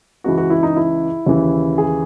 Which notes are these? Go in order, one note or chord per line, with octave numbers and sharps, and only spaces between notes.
C#2 C#3 E3 F#4
F#4
E4
D#4
E4
D#2 C#3 E3
G#4